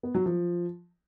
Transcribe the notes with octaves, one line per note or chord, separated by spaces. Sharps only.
B3
F#3
F3